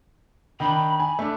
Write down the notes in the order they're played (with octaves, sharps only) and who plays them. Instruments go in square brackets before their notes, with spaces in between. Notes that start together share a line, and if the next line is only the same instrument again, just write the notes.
[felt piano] D#3 D4 [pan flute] B5
[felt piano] G#5
A3 D4